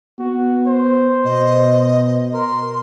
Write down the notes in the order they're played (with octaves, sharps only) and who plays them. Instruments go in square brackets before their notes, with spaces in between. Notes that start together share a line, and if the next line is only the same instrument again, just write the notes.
[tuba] B3 [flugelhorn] F#4
[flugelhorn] C5
[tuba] B2 [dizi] D#5
[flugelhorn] A#4 [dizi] C6